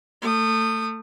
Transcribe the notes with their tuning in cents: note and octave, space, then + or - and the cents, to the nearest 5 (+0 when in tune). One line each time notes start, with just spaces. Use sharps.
A3 +25 D#6 -20